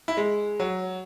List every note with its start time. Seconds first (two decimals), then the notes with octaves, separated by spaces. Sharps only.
0.08 E4
0.17 G#3
0.60 F#3